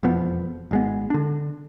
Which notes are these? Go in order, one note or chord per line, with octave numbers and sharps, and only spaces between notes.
E1 F2 F3 B3
G#1 G#3 B3
D3 D4